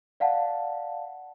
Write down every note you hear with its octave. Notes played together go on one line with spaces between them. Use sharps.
D5 F5 F#5 A5